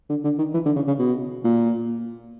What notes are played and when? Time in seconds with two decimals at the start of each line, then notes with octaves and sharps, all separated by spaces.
0.10 D3
0.24 D3
0.38 D#3
0.54 E3
0.66 D3
0.76 C#3
0.88 C#3
0.99 B2
1.44 A#2